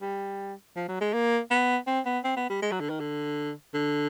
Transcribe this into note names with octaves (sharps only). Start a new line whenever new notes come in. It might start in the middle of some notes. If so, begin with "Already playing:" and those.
G3
F3
F#3
G#3
A#3
B3
C4
B3
C4
B3
G3
G#3
F#3
D3
D#3
D3
D3